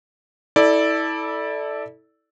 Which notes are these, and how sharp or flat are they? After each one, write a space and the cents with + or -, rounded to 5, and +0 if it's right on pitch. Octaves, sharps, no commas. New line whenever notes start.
E4 -25 A4 +0 D5 +0